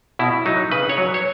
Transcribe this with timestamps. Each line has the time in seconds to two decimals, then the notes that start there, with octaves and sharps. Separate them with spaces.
0.19 B2 E4
0.46 F#3 D#4
0.72 C#3 B4
0.89 C#5
0.98 F#3
1.14 C#5